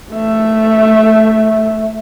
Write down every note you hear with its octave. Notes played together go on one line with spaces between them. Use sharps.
A3 E5